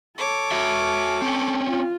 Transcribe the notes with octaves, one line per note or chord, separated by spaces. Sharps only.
A4 C#5 D6
F#4 E5
C4 C#4
F4